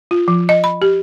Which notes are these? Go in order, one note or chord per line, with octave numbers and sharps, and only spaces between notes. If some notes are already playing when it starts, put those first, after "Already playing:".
F4
F3
D#5
B5
G4